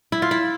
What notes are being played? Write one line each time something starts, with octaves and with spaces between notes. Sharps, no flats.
E4
F4
E4